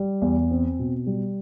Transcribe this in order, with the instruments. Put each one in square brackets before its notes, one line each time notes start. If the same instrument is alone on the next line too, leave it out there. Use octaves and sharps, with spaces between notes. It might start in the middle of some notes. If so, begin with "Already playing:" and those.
Already playing: [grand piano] G3
E2
C4
B2
G3